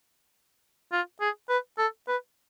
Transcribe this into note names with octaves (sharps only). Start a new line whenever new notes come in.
F4
G#4
B4
A4
B4